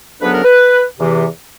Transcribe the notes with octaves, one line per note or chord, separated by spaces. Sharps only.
D2 C#3 F#3 B3 D4 B4
A#4
B4
E2 C3 E3